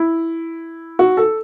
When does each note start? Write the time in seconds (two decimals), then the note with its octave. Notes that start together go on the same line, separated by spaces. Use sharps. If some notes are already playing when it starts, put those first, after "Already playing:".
Already playing: E4
0.99 F#4
1.17 A4